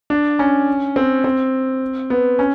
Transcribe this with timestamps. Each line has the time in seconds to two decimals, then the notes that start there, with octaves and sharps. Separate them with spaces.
0.10 D4
0.39 C#4
0.96 C4
1.24 C4
2.10 B3
2.39 C#4